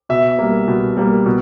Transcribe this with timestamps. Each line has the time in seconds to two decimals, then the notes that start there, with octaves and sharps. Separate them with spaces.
0.09 B2 E5
0.38 G3 A#3
0.68 B2
0.97 G3 A#3
1.26 B2